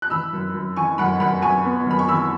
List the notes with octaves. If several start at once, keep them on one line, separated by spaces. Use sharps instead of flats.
F#6
E3 B5 E6
F#2
F#2
E3 G#5 C#6
F#2 F#5 B5
F#2 F#5 B5
F#2 G#5 C#6
B3
F#2 B5
C#6
E3 B5 E6